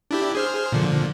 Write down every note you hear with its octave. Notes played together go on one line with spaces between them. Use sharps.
D4 E4 G4
G#4 C5 F6
A#2 D3 F3